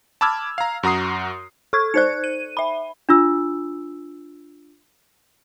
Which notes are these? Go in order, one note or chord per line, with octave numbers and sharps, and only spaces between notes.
A5 B5 D6 E6 F6 G#6
F5 A#5
F#2 F#4 A#5 D#6 C7
A4 C#6 G#6
D#4 C5 D5 F#6 G#6 C#7
D#7
E5 B5
D4 F4 E6